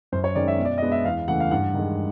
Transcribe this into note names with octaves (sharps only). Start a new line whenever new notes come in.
F#2 C5
C#5
D#3 G#3 C#4 D5
E5
B2
D5
G#3 B3 D4 D#5
E5
E2 F5
C#3 E3 A3 F#5
F5
G2 F#5
D#3 G#3